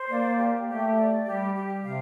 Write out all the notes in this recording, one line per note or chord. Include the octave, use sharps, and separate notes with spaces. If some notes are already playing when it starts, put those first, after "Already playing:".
Already playing: C5
A#3 D5
G4
A3 G4
D5
G3 G4
G4
C3 F5